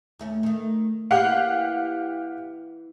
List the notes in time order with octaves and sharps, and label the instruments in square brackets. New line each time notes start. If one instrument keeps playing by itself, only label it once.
[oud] D#2 A3 C#4
D#3 A3
[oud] E3 A#3 E4 [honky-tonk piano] G4 F5 F#5